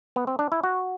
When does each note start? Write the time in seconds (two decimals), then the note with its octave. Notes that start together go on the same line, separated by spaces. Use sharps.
0.16 B3
0.27 C4
0.39 D4
0.52 E4
0.63 F#4